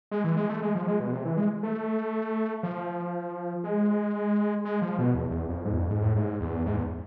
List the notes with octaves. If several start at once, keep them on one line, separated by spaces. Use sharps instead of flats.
G#3
E3
G#3
A3
G#3
F3
G#3
B2
C3
E3
G#3
A3
F3
G#3
G#3
F3
B2
E2
E2
F2
G#2
E2
F2
G#2
A2
G#2
E2
G#2
E2